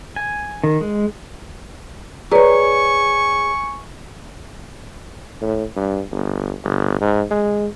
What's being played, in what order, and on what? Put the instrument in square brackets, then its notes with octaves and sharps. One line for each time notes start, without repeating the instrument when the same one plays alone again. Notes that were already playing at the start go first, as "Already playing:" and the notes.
[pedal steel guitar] G#5
D#3
G#3
[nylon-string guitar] G#4 C#5 [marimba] B4 D5 A#5 [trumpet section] G#5 C#6
[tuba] A2
G2
G1
G1
G#2
G#3